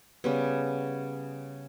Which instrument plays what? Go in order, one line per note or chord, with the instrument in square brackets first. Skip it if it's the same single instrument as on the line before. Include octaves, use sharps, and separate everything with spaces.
[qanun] C#3 G3 B3